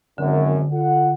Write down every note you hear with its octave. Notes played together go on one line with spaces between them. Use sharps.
G#1 F#2 D3
F4 A4 F#5